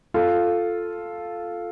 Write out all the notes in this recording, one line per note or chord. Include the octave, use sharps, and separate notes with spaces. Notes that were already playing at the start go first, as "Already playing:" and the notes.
F4 A4